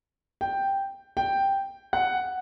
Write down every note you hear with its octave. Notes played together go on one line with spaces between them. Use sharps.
G5
G5
F#5